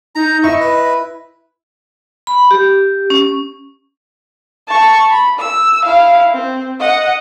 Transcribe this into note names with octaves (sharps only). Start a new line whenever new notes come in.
D#4 A#5
E4 D#5 C#6
B4
B5
G4
C#4
A5 C#6
B5
E6
E4 F5
C4
D#5 F#5